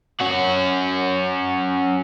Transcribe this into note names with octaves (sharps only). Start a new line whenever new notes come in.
C#4 F#4